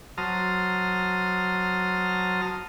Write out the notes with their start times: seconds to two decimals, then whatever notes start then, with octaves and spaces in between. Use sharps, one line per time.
0.18 F#3 C5 A5 A#5 D#6 F6